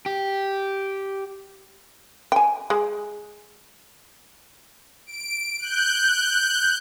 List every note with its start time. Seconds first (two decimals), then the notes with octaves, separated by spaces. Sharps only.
0.06 G4
2.32 G5 G#5
2.70 G#3
5.06 D7
5.59 F#6 G6